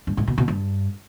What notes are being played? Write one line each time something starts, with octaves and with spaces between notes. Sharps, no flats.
G2
G#2
B2
B2
G2